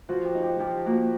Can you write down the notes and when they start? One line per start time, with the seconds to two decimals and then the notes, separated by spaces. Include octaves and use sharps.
0.09 F3 F#4
0.25 G4
0.35 D#4
0.43 G4
0.59 F3 G4
0.86 A#3 F#4